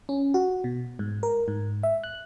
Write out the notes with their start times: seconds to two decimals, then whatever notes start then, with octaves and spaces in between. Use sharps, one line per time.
0.09 C#4
0.34 F#4
0.64 B2
0.99 G#2
1.23 A#4
1.48 G#2
1.83 E5
2.04 F#6